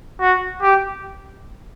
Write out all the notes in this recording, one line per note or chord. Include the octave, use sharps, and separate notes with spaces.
F#4
G4